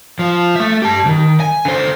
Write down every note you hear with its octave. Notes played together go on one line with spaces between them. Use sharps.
F3
A3 E5
G4 A5
B1 D#3
G#5
D3 C5